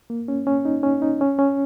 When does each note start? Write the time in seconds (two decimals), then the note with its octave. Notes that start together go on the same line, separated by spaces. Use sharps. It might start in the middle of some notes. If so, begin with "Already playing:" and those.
0.10 A#3
0.28 C#4
0.47 C#4
0.65 D#4
0.83 C#4
1.02 D#4
1.21 C#4
1.39 C#4